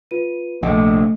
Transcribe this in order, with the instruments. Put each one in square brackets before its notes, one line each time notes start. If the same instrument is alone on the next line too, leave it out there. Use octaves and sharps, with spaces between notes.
[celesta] F4 B4 D#7
[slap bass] A#1 C3 [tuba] A3 [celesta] D#5